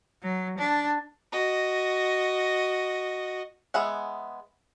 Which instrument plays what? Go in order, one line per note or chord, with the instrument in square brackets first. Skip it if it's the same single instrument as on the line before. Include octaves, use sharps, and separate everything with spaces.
[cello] F#3
D4
[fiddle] F#4 D#5
[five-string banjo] G#3 B3 G#4 E5 F#5